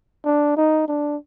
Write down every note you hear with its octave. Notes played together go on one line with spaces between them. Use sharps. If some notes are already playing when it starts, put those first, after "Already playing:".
D4
D#4
D4